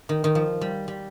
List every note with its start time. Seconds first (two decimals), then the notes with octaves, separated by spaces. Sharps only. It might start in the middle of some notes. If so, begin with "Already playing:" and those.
0.09 D#3
0.24 D#3
0.35 F3
0.61 G3
0.88 G3